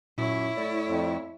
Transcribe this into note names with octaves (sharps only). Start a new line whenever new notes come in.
F#2 A#2 E4 C#5
A2 D5
F2